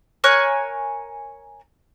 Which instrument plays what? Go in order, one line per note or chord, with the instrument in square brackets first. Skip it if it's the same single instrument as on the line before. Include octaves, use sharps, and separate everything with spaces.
[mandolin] A#4 C#5 G#5 F#6